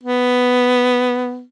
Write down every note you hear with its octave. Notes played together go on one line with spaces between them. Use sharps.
B3